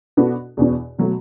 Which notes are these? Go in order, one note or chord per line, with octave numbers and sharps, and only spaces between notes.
B2 B3 D4 F#4 A4
E2 B2 B3 D4
B2 F#3 A3